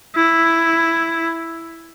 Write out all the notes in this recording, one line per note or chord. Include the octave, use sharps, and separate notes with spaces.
E4